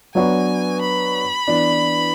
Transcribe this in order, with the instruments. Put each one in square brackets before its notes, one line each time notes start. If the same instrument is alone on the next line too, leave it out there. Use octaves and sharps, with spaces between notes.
[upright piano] F#3 B3 D4 F#4 [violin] G#5
[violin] B5
[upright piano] E3 B3 D4